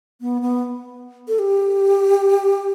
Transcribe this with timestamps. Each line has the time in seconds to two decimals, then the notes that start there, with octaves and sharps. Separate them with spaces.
0.21 B3
0.42 B3
1.28 A4
1.39 G4